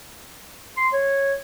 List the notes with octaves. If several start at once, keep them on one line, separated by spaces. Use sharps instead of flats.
C6
C#5